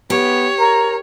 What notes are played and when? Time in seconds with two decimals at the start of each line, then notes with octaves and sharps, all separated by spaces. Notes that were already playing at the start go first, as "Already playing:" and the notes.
0.10 B3 G4 C#5
0.59 A#4 A#5